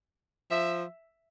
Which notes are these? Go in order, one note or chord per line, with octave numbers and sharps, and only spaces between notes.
F3 E5